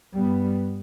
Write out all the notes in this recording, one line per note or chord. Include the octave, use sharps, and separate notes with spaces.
G2 G3 B3